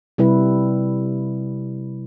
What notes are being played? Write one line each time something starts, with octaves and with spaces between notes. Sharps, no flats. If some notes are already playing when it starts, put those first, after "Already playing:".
C3 G3 E4 B4